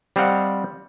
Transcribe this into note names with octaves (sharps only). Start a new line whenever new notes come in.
G3 C4 C5 D#5 F5 F#5